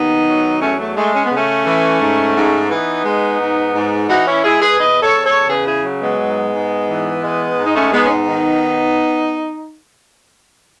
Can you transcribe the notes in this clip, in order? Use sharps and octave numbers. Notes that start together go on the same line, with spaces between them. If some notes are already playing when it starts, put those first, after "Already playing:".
Already playing: D#2 D#3 B3 D#4
F#3
E2 A3 C#4
A3
G#3 A3
C#4
B3
C#3
A3 C#4
E3
G#2
G#2
E3 B3 D#4
G#3
G#2
G#2
E3 D#4 F#4
C#4 E4
G#3 E4 G#4
G#4 B4
E2 B4 D#5
A4 C#5
E2
A4 C#5
C#3 G#4 B4
E4 G#4
F#3
G#3 B3
G#2
G#2
E3
G#3
G#2
D#4
A3 C#4
G#2 G#3 B3
C#4
B3 D#4
D#3